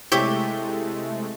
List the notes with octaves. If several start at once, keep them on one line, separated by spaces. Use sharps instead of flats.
C3 G#3 A3 E4 G4 C#5 E5